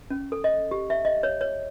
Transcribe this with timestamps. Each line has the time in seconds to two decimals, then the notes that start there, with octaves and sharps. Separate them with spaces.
0.10 C#4
0.32 A4
0.44 D#5
0.71 G4
0.90 E5
1.05 D#5
1.23 C#5
1.41 C#5